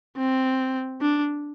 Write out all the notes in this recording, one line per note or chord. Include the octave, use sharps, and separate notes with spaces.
C4
D4